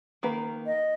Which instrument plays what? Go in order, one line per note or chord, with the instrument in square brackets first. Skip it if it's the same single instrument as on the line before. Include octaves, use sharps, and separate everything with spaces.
[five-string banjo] D#3 A#3 B4
[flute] D#5